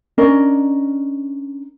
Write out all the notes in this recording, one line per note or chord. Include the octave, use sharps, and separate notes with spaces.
C#4 D4 A#4 D#5